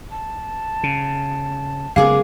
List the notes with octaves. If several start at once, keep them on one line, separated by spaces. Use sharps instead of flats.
A5
C#3
F#1 C#3 G#3 B3 G#4 A#4 F5 D6